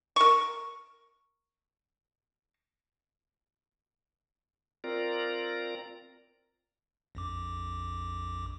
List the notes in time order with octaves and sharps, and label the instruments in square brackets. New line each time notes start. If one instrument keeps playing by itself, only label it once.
[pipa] A#4 C#6
[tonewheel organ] C4 F4 A#4 D5 A#5
[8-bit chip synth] A#1 F2 D6